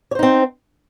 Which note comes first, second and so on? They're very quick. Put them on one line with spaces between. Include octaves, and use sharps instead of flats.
C#5 C5 D#4 C4